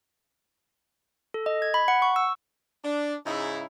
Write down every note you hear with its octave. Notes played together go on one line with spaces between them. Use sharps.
A4
D#5
G#6
B5
F#5
C#6
E6
D4
G#2 C#3 D#4 E4